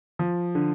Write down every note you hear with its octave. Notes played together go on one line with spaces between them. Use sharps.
F3
D3